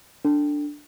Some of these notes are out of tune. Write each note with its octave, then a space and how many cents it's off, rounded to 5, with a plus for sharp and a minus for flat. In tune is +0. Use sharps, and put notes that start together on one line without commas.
D4 +0 A4 +20